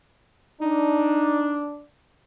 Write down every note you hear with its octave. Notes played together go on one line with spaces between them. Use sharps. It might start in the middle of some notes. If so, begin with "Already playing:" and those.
D4 D#4